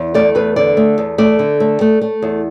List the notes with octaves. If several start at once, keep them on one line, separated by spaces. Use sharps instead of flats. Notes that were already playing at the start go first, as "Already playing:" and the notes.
Already playing: E2
A3 D5
E2 B4
D3 D5
A3
E2
A3 D5
D3
A3
A3
A3
E2